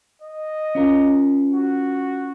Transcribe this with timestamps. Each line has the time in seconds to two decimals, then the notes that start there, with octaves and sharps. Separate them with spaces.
0.22 D#5
0.75 C#4 F4 A#4
1.54 F#4